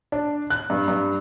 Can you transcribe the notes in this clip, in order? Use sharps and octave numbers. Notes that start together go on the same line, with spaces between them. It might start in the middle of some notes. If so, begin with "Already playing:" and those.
D4
F#6
G2
G2